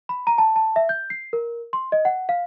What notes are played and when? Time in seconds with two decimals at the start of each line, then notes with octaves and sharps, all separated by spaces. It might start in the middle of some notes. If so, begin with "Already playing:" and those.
0.09 B5
0.27 A#5
0.38 A5
0.56 A5
0.76 E5
0.89 G6
1.10 C7
1.33 A#4
1.73 C6
1.92 D#5
2.05 F#5
2.29 F5